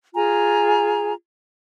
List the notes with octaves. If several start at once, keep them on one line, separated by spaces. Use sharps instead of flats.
F4 G#4 G#5 A#5